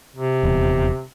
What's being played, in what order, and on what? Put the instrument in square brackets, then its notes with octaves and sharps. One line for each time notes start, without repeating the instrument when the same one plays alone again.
[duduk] C3
[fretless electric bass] D#1 E2